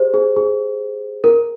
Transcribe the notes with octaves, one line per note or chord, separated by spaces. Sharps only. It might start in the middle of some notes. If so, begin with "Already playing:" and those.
Already playing: G4 G#4 C5
G#4
G#4
A#4